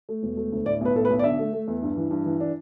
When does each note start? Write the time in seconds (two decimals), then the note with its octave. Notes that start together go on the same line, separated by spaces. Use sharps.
0.09 A3
0.23 E1
0.37 A3
0.52 D2
0.66 A2 D5
0.81 B1 B4
0.95 A2 A4
1.05 B4
1.10 B1
1.19 D5
1.24 D3 E5
1.39 A3
1.53 A3
1.68 E2
1.82 G2
1.97 E3
2.11 G2
2.26 E3
2.40 D4